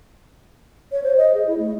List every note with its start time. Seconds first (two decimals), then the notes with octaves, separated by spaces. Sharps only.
0.92 C#5
1.03 C5
1.17 D#5
1.34 G#4
1.47 E4
1.58 A3